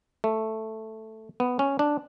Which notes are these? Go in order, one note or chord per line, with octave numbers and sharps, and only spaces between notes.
A3
B3
C#4
D4